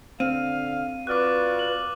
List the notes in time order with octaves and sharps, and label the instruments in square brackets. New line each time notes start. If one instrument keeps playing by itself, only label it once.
[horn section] D3 F5 [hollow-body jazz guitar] C4 [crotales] D#7
[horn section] F4 F#4 D5 [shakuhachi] B4 [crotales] D6 F6 F#6
[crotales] F#7